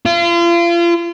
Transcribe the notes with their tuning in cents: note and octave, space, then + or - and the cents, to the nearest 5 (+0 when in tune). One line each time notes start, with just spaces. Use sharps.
F4 -35